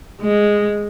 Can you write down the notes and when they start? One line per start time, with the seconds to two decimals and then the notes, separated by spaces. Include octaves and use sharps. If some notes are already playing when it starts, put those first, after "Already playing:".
0.21 G#3